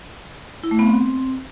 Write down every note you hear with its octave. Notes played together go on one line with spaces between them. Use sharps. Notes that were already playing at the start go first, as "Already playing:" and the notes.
E4
A3
B3
C4